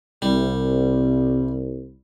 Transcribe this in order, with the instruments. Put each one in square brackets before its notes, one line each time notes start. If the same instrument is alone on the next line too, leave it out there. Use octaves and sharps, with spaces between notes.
[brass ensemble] C2 [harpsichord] G3